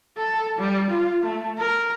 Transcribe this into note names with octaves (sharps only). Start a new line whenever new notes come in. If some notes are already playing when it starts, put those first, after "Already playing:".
A4
G3
F4
A3
A#4